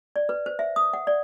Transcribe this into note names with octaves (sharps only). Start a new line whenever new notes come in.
D5
B4
C5
E5
D#6
F#5
D5